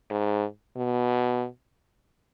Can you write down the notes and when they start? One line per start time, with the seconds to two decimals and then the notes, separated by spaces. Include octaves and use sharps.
0.10 G#2
0.77 B2